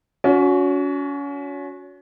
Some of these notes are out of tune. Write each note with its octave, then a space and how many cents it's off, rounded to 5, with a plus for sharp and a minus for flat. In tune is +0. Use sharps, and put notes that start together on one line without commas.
C#4 +30 F#4 -20